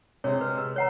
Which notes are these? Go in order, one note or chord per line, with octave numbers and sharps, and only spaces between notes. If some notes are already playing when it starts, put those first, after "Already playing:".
C3 G#3 C#5
B4
E6
C#5 F#5 A#5